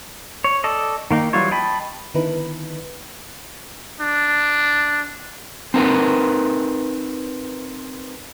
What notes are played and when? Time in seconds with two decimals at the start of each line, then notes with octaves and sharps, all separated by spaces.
0.44 C#5
0.64 A4 D5 D#5
1.11 D#3 A#3 D#4
1.33 E3 F#3 G3 F4 C#5
1.51 D#5 G5 A5 B5
2.14 D3 D#3 B3 D#4 E4 B4
4.00 D4
5.74 C4 D#4 A#4 B4